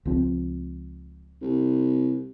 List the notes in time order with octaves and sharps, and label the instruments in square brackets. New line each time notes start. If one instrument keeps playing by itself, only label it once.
[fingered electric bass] C#2 F3 C4
[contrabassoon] C2